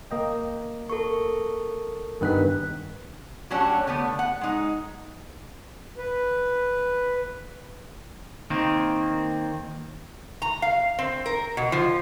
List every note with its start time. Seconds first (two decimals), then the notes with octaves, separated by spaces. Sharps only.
0.11 A#3 D#5 G5
0.89 A4 A#4 C#6
2.21 G2 D#3 B3 D4 F#6 B6
3.50 F#3 A3 C#4 D4 F#4 G4
3.87 D3 A3 B3
4.19 F#5
4.41 G#3 D#4
5.98 B4
8.50 D#3 A#3 C4
10.42 A#5
10.62 F5
10.99 C4
11.26 A#4
11.57 B2
11.72 F3